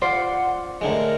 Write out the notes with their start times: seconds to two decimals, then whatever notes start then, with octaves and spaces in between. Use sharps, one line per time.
0.02 F4 C5 D5 F#5
0.81 A2 D3 G#3 A#4